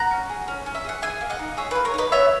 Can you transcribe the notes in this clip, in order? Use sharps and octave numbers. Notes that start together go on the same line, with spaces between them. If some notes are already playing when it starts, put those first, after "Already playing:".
Already playing: F#5 A#5
C#4
G#4
C#4
C#4
E5
G#4 F#5
G#4 E5 G#5
A#3
D#5 F#5
D#4
G#4 C#5 E5
A#3 B4
A#4 C#5
D#4
B4 D#5
B3 C#5 E5